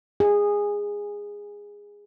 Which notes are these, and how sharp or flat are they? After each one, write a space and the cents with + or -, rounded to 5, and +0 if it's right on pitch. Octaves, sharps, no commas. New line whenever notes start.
G#4 -15